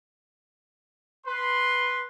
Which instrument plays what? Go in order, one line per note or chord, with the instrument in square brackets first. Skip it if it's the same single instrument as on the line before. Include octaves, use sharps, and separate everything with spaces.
[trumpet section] B4 C6